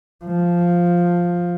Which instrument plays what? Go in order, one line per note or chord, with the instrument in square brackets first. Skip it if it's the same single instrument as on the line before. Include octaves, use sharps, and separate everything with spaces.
[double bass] F3